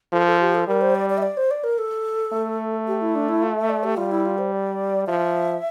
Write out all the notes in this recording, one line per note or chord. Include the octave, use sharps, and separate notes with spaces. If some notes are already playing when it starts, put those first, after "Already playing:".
F3 A4
A4
G4
A4
G3 A#4
C5
D5
D5
E5
D5
C5
D5
A#4
A4
A3
G4
E4
D4
E4
F4
E5
D5
G4
G3 F4
E4
F4
C5
D5
F3 E5